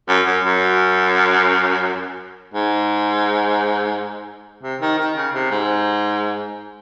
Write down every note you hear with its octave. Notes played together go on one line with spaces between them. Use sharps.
F#2
F#2
F#2
G#2
C3
D#3
D#3
C#3
C3
G#2